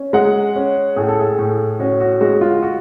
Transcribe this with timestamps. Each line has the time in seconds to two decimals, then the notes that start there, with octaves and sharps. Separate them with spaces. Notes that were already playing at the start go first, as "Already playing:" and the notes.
Already playing: C#4
0.13 G#3 F#5
0.56 C#4
0.96 A2 G#4
1.09 A4
1.19 G#4
1.39 A2
1.80 C#4 F#4
2.00 F#4
2.21 G#3 F#4
2.41 F4
2.63 F#4